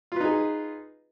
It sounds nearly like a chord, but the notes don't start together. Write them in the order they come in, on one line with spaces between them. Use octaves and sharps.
F4 B4 D#4 G#4